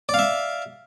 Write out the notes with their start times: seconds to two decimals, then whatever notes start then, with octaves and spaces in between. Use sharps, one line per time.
0.09 D5
0.14 F5
0.19 E5